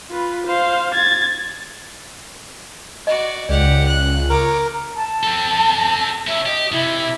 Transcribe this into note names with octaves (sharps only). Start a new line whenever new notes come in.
F4 B4
C5 F5
G#6 A6
F#4 D5 D#5
C#2 G4 D5 F#5
F#6
A#4 C#5 D6
A5
C4 A4
C#4 E4 E5
G4 D#5
C3 E4